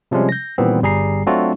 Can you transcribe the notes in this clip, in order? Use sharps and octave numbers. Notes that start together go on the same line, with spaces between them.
C3 F3 G3 G#3 C#4
G6 A#6
A#2 D#3 E3 G3 B3 C4
G1 G3 G#4 A#5 C7
F#3 A3 C4 D4 F4 F#4